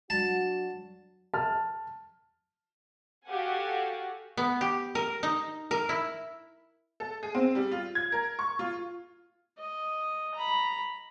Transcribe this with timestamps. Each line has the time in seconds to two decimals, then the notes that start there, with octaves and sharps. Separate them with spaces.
0.10 F#3 D4 F#4 A5
1.34 A5 F6
3.27 F#4 G4 A4 F5 F#5 G#5
4.37 B3
4.61 G4
4.95 A#4
5.23 D#4
5.71 A#4
5.89 E4
7.00 A4
7.23 G#4
7.35 C4
7.55 G3
7.72 F4
7.95 G#6
8.12 A#4
8.39 C#6
8.59 F4
9.58 D#5
10.35 A#5 B5